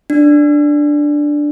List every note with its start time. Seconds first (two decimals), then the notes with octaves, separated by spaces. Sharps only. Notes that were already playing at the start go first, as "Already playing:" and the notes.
0.10 D4